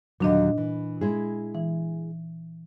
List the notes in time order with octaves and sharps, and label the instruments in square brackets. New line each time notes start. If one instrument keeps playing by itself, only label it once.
[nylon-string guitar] D#2 D3 F#3 [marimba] A#2 D4 D#5
[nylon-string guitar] E3
G#3 E4 G#4
[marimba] E3